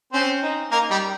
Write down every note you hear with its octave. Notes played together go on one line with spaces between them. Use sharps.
C4 C#4 C5
D#4
A#3 D#4 A#4
G3 G4